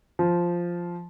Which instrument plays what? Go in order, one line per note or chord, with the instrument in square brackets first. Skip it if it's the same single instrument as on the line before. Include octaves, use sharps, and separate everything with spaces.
[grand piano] F3